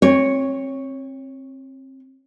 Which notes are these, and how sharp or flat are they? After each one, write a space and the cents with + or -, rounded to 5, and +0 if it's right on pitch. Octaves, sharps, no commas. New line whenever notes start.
C4 +30 C#5 +0